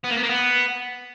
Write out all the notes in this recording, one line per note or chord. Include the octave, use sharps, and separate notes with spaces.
B3
A#3
B3
A#3
B3